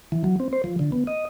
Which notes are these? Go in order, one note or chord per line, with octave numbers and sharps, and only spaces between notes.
E3
F#3
C4
C5
F3
D3
B3
D#5